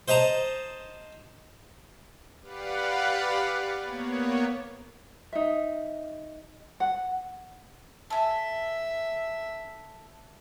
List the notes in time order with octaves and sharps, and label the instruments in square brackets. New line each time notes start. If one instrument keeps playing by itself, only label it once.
[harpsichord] C5 D#5 A5 A#5
[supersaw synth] G4 B4 D5 F5 F#5
A#3 B3 C#5
[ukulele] D#4 E5
F#5
[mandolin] A4 G#5 [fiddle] E5